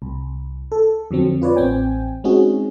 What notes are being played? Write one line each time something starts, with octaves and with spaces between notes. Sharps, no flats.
C2
A4
F2 D3 F#3 C4
F4 B4 C#5 D5
A1 C4 G5 G#5
G#3 C4 C#4 D#4 F#4 G#4